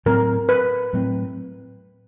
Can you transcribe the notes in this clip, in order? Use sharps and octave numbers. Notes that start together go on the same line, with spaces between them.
A2 F#3 A3 C4 A#4
B4
A2 F#3 A3 C4